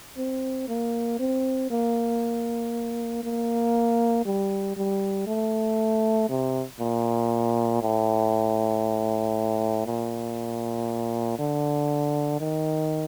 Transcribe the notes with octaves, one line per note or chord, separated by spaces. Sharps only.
C4
A#3
C4
A#3
A#3
G3
G3
A3
C3
A#2
A2
A#2
D3
D#3